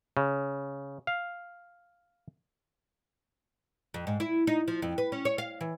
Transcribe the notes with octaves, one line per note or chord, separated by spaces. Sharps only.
C#3
F5
F2
G#2
E4
D#4
F3
F2
B4
C#4
C#5
F5
E3